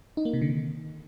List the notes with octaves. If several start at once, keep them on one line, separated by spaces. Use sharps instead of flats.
D#4
A#3
C3
D3
D#3